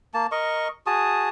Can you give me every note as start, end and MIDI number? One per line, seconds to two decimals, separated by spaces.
0.14 0.26 58
0.14 0.26 81
0.32 0.68 70
0.32 0.68 75
0.32 0.68 85
0.87 1.29 66
0.87 1.29 68
0.87 1.29 81
0.87 1.29 87